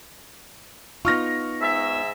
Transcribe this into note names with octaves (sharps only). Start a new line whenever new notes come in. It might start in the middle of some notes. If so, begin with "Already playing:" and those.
B3 D#4 F4 C#6 F6 A#6
G#2 E5